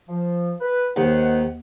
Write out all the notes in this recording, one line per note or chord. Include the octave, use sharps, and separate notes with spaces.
F3
B4
D#2 D#3 C5 F#5